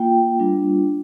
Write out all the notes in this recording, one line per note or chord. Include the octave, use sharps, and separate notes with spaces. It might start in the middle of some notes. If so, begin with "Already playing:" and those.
Already playing: A#3 F4 G5
G3 D4 F4